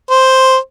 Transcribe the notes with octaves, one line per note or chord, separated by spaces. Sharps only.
C5